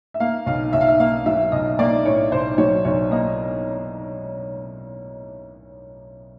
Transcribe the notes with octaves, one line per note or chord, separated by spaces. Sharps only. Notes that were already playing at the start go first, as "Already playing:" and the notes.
E5
A#3 F5
B1 F5
B1 E5
F5
E5
A#3 F5
F#3 E5
B1 D#5
A#3 D5
A2 C#5
B1 C5
F#3 C#5
B1 C#5
A#3 D#5